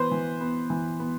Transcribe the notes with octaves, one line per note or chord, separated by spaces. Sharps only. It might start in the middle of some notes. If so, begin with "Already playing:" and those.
Already playing: E3 B3 B4 C5
E3
B3
E3
B3